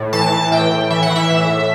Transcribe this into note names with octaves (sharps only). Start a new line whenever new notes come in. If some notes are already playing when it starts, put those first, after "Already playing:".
Already playing: A2
E3 A5
E3
A2 G5
A2
E3 E5
F#5
E3
E5
A2
A2